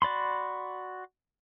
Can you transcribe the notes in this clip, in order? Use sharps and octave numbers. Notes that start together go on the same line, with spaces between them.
F#4 D5 B5 C6